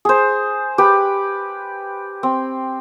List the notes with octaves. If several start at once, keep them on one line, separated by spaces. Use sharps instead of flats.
G#4 C5
G4 B4
C4